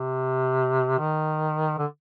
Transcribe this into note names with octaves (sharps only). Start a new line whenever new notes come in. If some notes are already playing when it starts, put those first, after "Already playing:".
Already playing: C3
D#3
D3